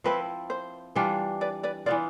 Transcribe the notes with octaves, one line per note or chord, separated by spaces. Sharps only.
F3 C4 E4 B4
C5
E3 G3 D4 F4
B4 D5
B4 D5
E3 B3 F4 D5